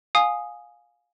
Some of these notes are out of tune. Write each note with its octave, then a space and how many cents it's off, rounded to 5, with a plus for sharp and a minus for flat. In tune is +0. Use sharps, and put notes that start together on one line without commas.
F5 +20 G#5 +0 D#6 +0